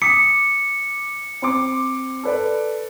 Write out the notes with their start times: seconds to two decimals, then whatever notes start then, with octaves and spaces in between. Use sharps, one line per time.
0.02 D6 D#6 B6 C#7
1.42 C4 C6 D6
2.23 A4 B4 D5